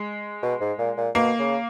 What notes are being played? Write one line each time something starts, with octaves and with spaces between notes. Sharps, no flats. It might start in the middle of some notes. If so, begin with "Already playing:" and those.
Already playing: G#3
B2
G#2
A#2
A#2
B2 A#3
C#3